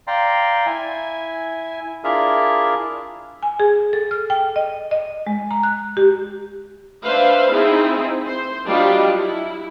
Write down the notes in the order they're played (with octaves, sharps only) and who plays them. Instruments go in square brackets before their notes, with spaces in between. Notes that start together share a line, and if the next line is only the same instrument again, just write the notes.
[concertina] D5 F5 G5 A#5 C6
E4 G#5
D4 E4 F4 G#4 A#4 E5
[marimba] G#5
G#4
A4
F6
G5
D#5
D#5
G#3
A#5
F#6
G4
[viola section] D4 B4 C5 E5 F5
C4 D#4 E4 G#4
C5
F#3 G3 D4 F4 G4 D#5
E4